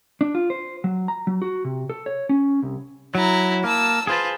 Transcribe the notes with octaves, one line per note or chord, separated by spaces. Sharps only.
D4
F4
C5
F#3
A#5
F#3
F#4
C3
A4
C#5
C#4
C2
F#3 E4 A#5
A#3 A5 E6
F4 G#4 B4 C5 A5